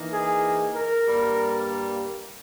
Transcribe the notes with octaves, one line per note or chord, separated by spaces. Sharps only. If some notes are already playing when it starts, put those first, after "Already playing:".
Already playing: E3 A#3 D#4
G#4
A#4
G2 G3 A#3